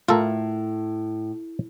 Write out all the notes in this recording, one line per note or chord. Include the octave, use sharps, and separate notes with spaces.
A2 F4 A4 A#4